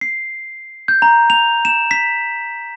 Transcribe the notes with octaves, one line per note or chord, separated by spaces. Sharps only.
C7
G6
A#5
F7
E7
B6